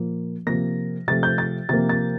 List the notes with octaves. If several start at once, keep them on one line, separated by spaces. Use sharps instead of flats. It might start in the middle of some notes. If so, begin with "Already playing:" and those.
Already playing: A#2 F3 A#3
C3 F3 A#3 A#6
C3 F3 A3 A6
G6
A6
C3 F3 A#3 A6
A6